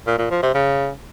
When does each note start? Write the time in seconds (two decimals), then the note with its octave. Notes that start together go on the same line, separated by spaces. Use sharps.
0.06 A#2
0.18 A#2
0.30 F3
0.42 C3
0.54 C#3